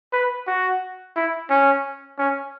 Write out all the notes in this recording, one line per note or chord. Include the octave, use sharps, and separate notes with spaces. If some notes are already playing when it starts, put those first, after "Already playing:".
B4
F#4
E4
C#4
C#4